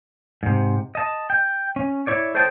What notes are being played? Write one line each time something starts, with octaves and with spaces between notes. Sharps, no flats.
G#2 C3
D#5 A5
G5
C#4
E4 C#5 D5
A4 C5 C#5 D#5 G5 A5